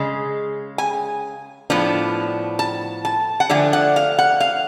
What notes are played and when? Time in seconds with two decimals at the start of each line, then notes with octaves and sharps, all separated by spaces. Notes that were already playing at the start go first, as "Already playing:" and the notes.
Already playing: C#3 G#3
0.78 G#5
1.70 A2 F3 B3 D4
2.59 A5
3.05 A5
3.40 F#5
3.50 D3 F3 A3 D4 G#5
3.73 F#5
3.96 F5
4.19 F#5
4.40 F5